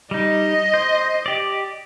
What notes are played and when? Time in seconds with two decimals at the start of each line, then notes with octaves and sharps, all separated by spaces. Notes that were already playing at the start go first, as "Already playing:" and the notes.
0.11 G3 D#4 D#5
0.74 C5
1.26 G4 D5